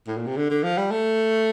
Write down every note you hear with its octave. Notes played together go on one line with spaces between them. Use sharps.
A2
A#2
C3
D3
D3
F3
G3
A3